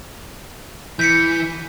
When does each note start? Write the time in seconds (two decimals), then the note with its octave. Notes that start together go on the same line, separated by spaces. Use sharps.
0.99 E3 G6 B6 C#7